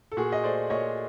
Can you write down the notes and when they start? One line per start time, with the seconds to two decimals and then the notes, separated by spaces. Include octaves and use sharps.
0.12 A4
0.17 A#2 F#4 G#4
0.32 D#5
0.44 A3 C5 D5
0.70 A#2 C#5 D#5